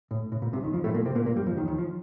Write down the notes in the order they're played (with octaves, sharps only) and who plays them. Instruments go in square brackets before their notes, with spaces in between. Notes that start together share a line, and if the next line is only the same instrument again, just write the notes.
[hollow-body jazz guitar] A2
A2
A#2
C2 C3
D#2 D#3
F2 F3
A2 A3
A#2 A#3
C3 C4
A#2 A#3
A#2 A#3
G2 G3
F2 F3
D#2 D#3
D#2 D#3
F3